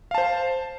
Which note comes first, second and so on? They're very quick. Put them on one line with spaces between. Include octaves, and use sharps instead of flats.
F5 A5 C5